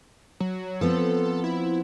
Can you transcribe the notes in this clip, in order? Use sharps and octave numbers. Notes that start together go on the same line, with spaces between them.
F#3
F3 B3 C4 A4
E4